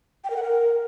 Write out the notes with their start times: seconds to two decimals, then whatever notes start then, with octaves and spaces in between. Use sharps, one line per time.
0.24 G5
0.30 A#4
0.36 F#5
0.42 A#4